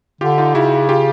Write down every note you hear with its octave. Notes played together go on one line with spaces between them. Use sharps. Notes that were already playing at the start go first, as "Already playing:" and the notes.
D3 F4 G4
D#4 F4
C#3 E4 F#4
F4 G4